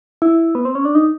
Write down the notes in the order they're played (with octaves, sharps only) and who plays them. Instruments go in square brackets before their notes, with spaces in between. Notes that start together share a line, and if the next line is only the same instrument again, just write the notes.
[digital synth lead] E4
B3
C4
C#4
D4
D#4